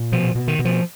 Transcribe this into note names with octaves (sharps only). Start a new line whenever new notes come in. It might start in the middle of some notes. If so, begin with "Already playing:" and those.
Already playing: A#2
B2 F3
B2
D#3
B2
F3